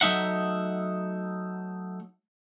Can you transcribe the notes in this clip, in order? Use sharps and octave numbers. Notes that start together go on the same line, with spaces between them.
F#3 A3 D#4 E5 F#5